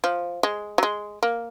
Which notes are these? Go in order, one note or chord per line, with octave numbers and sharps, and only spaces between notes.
F3
G#3
F#3
G#3
A#3